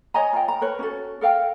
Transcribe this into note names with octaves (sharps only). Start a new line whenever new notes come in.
C#5 D#5 G#5 A#5
F4 G5
A#5
A#4 B4 C#5
C#4 F#4 A4
A4 A#4 F5 G5